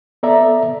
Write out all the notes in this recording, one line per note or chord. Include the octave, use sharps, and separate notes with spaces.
B3 A4 D5 E5 A#5